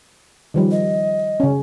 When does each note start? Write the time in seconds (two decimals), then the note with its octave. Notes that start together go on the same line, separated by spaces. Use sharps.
0.54 D#3 F3 G3
0.71 D#5
1.40 C#3 C#4